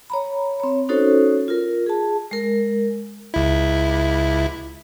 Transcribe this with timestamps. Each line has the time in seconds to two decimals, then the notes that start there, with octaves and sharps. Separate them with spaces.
0.10 C#5 A#5 B5
0.60 C4 C#5
0.89 C#4 D#4 F#4 A4 C5 C#5
1.48 F4 A#4
1.86 G#4 A5
2.31 G#3 A#4
3.34 C#2 E4